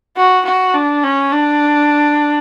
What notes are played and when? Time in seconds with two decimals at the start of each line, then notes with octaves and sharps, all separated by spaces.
0.17 F#4
0.45 F#4
0.74 D4
1.03 C#4
1.32 D4